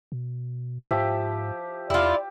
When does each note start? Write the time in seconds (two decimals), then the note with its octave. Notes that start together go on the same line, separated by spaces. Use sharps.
0.12 B2
0.91 G#2 F3 G4 E5
1.90 E2 E4 F4 G4 D5